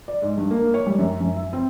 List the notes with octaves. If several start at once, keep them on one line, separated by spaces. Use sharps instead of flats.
D5
G#2
G2
A#3
C#5
G3
F#2
F#2
E5
C4